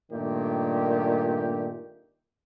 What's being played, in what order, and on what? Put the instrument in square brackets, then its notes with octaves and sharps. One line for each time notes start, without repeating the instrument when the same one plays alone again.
[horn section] G2 A#2 D#3 A3 G4